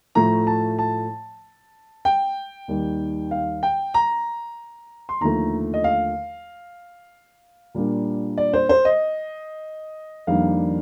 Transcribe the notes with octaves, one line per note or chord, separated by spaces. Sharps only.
A2 F3 A3 A#5
A5
A5
G5
D#2 D#3 G3
F5
G5
A#5
C6
D#2 D3 F3 A3 A#5
D#5
F5
A#2 G3 A#3 D4
D5
C5
C5
D#5
F2 D#3 G3 A#3 D4 F5